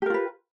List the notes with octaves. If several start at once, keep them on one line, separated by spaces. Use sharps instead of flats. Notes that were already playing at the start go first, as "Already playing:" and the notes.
F4 G4 A#4 B4